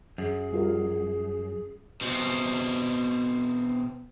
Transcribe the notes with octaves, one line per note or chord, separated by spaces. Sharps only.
F#2 G#4
G3 F4 A#4
B2 C4